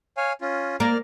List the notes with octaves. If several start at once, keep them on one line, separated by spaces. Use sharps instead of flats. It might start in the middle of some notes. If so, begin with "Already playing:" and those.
C#5 F5 G#5
C#4 F4
A#3 D5 F6